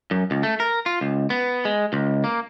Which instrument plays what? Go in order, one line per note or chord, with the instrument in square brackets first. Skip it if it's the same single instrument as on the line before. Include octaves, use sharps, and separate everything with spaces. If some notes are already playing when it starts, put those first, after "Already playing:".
[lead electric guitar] F#2
C#2
A3
A#4
F4
C#2
B3
G#3
C#2
A#3